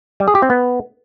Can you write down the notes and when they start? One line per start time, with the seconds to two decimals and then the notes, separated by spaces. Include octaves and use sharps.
0.20 G3
0.28 G#4
0.35 G4
0.42 C4
0.50 B3